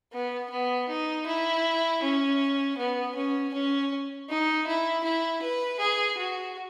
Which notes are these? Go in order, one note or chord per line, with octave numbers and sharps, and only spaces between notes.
B3
B3
D#4
E4
C#4
B3
C#4
C#4
D#4
E4
E4
B4
G#4
F#4